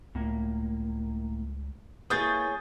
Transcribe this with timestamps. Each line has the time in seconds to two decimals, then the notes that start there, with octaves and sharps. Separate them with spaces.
0.15 C#2 A2 A#3
2.10 A#3 E4 G#4 B4 C#5 D#6 G6 A6